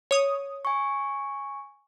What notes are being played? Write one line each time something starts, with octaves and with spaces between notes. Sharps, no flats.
C#5 D#6
G#5 C#6